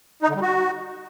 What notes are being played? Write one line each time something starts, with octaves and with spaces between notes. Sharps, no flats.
D#4
D3
G3
F#4